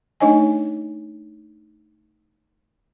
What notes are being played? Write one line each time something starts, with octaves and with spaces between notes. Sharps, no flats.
A3 D4 D#4 C#5 D#5 G#5